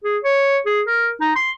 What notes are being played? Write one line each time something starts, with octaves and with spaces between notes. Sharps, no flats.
G#4
C#5
G#4
A#4
D#4
C6